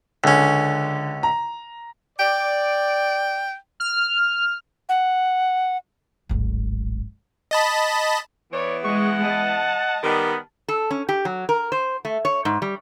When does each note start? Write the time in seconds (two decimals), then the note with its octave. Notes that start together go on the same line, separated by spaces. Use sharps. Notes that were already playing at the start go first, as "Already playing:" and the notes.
0.24 C#2 D3 C#4
1.23 A#5
2.19 D5 G5
3.80 F6
4.89 F#5
6.29 D1 G#1
7.51 D#5 A5 B5
8.53 E3 B3 C#5 D5
8.85 G#3 D#5 F#5 C#6
9.24 D#5 A5
10.04 D#3 G3 B3
10.68 A4
10.91 C#4
11.09 G4
11.25 F#3
11.49 A#4
11.72 C5
12.05 A3
12.25 C#5
12.45 G#2
12.62 G3